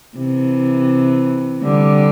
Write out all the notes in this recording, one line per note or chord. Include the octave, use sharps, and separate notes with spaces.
C3 E3
D3 G3